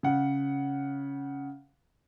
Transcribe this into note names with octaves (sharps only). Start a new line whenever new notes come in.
C#3 F#5